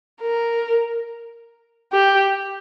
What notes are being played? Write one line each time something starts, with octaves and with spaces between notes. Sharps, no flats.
A#4
G4